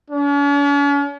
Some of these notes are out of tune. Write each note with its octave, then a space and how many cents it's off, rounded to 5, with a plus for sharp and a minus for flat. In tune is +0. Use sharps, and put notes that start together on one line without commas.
C#4 +45